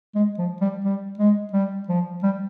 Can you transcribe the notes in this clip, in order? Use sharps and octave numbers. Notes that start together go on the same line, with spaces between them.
G#3
F3
G3
G3
G#3
G3
F3
G3